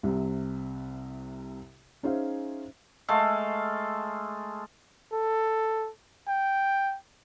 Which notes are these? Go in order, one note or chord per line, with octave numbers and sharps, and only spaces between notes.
C2 C3
C#4 D#4 G#4 C5 E5 F5
G#3 A3 A4 F5
A4
G5